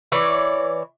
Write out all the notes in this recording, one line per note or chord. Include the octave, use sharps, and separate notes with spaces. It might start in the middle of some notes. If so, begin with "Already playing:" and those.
E3 C#5 D5